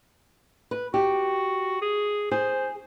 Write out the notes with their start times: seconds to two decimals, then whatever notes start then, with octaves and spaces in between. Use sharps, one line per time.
0.71 B4
0.94 F#4 G4
1.81 G#4
2.31 G#4 C5